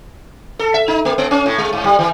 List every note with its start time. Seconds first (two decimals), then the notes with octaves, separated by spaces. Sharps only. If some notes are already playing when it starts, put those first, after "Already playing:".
0.59 A4
0.74 E5
0.88 D#4
1.05 A#3
1.18 B3
1.31 C#4
1.46 A2
1.58 G#3
1.73 G#2
1.84 G3
1.99 E3